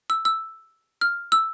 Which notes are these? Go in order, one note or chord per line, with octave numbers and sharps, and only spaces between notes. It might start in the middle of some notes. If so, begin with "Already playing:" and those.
E6
E6
F6
E6